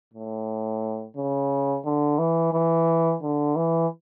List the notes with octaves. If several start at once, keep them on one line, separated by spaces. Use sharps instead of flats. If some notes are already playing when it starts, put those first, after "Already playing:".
A2
C#3
D3
E3
E3
D3
E3